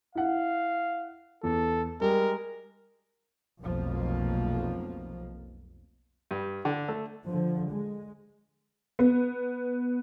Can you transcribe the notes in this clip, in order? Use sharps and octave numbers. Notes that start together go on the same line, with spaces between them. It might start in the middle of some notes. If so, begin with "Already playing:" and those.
E4 F5 F#5
E2 A4
G3 G#3 A#4
F1 B1 F2 B2 F3 A#3
G2
D3
A3
D3 F3
G#3
B3